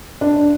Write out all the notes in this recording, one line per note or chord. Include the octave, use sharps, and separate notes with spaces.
D4